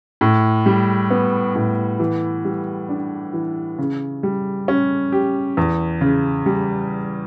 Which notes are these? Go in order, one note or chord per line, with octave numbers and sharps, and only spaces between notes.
A2
G3
B3
A2
E3
G3
D4
E3
C#3
G3
C#4
G4
E2
C#3
G3